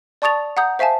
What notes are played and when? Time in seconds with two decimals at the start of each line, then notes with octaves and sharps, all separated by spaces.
0.22 D5 A5 C#6 D#6 A6 F7
0.57 F#5 A#5 D#6 G6
0.79 C5 E5 F5 G#5 A5